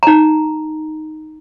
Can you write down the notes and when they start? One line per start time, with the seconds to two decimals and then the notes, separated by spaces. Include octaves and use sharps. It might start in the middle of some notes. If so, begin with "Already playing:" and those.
0.03 D#4 A#5